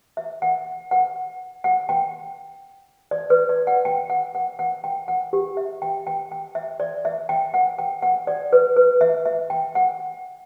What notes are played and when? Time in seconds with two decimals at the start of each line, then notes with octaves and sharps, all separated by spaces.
0.17 E5
0.42 F#5
0.91 F#5
1.64 F#5
1.89 G5
3.11 D5
3.30 B4
3.49 D5
3.67 F#5
3.85 G5
4.10 F#5
4.35 F#5
4.59 F#5
4.84 G5
5.08 F#5
5.33 G4
5.57 E5
5.82 G5
6.07 G5
6.32 G5
6.55 E5
6.80 D5
7.05 E5
7.29 G5
7.54 F#5
7.79 G5
8.02 F#5
8.27 D5
8.53 B4
8.77 B4
9.01 E5
9.25 E5
9.50 G5
9.75 F#5